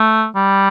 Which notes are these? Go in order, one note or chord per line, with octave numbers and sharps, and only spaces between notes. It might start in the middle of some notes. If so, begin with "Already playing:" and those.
Already playing: A3
G3